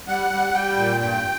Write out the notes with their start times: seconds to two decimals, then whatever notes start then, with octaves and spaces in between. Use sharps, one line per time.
0.08 G3 F#5
0.31 G3
0.54 G3 G5
0.77 A#2
1.00 G2 G5